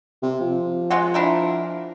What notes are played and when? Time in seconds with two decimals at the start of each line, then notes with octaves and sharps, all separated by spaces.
0.23 C3
0.40 F3
0.90 G#3 F4 F#4
1.14 D4 E4 A#4